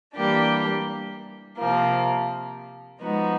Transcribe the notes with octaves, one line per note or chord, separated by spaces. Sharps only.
E3 G3 A#3 D4 G4
C3 F3 A#3
F3 G#3 B3 D#4 F#4